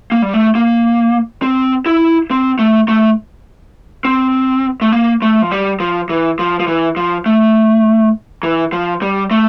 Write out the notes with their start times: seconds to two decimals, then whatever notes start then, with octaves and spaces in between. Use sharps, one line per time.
0.12 A#3
0.22 G3
0.34 A3
0.55 A#3
1.42 C4
1.86 E4
2.31 C4
2.59 A3
2.88 A3
4.05 C4
4.81 A3
4.92 A#3
5.22 A3
5.42 F3
5.52 G3
5.80 F3
6.09 E3
6.39 F3
6.60 F3
6.67 E3
6.97 F3
7.26 A3
8.43 E3
8.72 F3
9.02 G3
9.31 A3